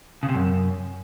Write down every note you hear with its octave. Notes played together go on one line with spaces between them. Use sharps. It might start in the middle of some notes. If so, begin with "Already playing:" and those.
C#3
C3
F#2